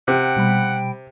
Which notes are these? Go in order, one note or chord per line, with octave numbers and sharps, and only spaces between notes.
C3 F#5 G5
B2 G3 B5